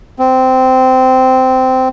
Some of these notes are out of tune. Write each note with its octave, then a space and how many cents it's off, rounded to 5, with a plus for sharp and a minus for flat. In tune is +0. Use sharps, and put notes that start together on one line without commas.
C4 -15